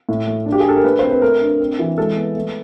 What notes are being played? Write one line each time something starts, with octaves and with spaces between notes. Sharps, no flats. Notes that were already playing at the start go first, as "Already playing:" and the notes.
A2
A3
D4
G4
G#4
D4 A4
A#4
A3 B4
C4 C5
B4
A3 A#4
D4
C4
E3
G#3 A4
B3
A3